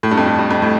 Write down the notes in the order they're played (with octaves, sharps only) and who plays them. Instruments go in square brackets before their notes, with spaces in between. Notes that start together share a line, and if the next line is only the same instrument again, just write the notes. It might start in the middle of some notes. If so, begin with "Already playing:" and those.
[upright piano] A2
G2
F2
G2
G2
F2
A2